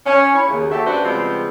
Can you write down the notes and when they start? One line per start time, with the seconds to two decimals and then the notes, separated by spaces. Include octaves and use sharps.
0.06 C#4
0.35 E4 C#5
0.48 D#2 C#3
0.71 F#4 G4 A4 E5
0.86 F#2 D4 F#4 B4 C5
1.04 C#3 F3 G3 G#3 B3 C4